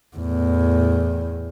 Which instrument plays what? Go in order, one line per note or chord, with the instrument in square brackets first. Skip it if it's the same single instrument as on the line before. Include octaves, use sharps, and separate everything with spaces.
[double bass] E2 A2